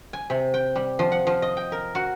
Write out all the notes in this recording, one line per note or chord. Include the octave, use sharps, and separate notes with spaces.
G#5
C3
G5
G3
F3
F#5
F3
D#5
G5
A#4
F#4